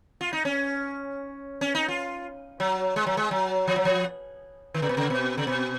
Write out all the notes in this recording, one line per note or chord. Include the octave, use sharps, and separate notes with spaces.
F4
D#4
C#4
C#4
D#4
F4
F#3
G#3
F#3
G#3
F#3
F3
F#3
F3
D#3
C#3
B2
C#3
B2
C#3
B2